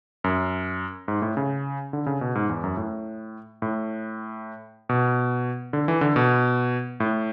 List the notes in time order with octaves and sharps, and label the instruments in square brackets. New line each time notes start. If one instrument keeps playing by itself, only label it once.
[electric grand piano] F#2
G#2
A2
C#3
D3
C#3
B2
G#2
E2
F#2
A2
A2
B2
D3
E3
D3
B2
A2